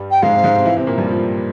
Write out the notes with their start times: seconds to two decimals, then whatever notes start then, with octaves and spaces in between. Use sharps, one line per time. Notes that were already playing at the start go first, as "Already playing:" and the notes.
Already playing: G2 G3
0.11 G5
0.23 G#2 G#3 F5
0.33 C3 C4
0.44 G#2 G#3
0.55 C3 C4
0.65 E3 E4
0.76 C3 C4
0.87 A#2 A#3
0.98 G2 G3
1.09 F3